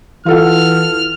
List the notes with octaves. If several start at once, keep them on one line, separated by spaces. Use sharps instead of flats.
E3 F4 A4 F#5 F6